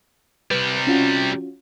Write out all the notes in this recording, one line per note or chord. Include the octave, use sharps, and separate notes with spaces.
C3 G3 B4
C#4 F4 F#4